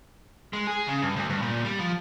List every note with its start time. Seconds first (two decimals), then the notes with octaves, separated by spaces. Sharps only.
0.53 G#3
0.67 G#4
0.87 C#3
1.02 G2
1.16 D2
1.29 G2
1.42 A#2
1.65 G3
1.79 F3